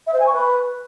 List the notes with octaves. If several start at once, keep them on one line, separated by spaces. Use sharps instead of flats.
E5
C5
G#5
C#6
B4